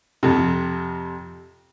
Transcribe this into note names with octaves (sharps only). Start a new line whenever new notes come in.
F2 C3